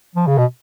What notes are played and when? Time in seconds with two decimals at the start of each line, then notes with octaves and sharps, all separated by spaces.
0.15 F3
0.27 C#3
0.38 B2